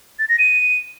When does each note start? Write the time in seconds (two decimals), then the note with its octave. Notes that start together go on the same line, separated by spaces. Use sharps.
0.19 A6
0.29 A#6
0.39 D#7